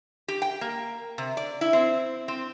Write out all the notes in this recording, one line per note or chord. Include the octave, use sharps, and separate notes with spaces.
G4
G5
A#3
C3
D5
E4
C4
C4